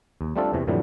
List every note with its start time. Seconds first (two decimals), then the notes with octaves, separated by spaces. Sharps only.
0.21 D#2
0.36 G3 A3 C4 D4 F4 A4
0.53 E2 C3 E3
0.67 F2 A2 D3 E3 F#3 G3